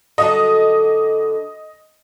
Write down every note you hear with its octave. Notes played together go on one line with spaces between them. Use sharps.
D3 F#3 A4 D#5